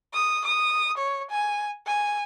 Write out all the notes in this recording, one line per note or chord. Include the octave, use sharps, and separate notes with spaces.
D#6
D#6
C#5
G#5
G#5